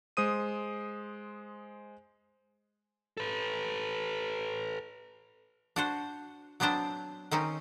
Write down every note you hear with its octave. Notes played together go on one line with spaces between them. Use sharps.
G#3 C5 D#6 D#7
A4 B4
D4 F#4 C5
F#3 B3 C4 D4 C5
D#3 C4 C#4 D#4